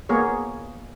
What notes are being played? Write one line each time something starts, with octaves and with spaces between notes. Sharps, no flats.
A#3 B3 G#4 C#5